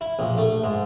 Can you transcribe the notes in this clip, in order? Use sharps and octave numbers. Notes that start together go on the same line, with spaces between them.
E4
A#1
A3
G#2